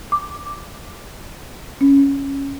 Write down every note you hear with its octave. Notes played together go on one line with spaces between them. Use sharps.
D6
C#4